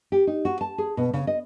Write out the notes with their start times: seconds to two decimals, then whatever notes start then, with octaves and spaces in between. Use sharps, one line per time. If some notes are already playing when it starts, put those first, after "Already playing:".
0.12 G4
0.27 D#4
0.45 F#4
0.61 A5
0.78 G#4
0.97 B2
1.14 C#3
1.27 D#5